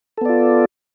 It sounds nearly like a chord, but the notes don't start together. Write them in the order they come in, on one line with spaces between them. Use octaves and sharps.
A4 B3 D5 F4